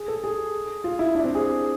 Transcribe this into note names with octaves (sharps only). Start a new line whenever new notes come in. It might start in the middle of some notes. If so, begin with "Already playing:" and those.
Already playing: G#4
A4
G#4
F4
E4
D4
C4
G#4